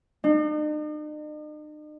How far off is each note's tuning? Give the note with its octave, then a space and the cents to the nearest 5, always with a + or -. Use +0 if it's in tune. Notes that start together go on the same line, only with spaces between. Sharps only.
D#4 -45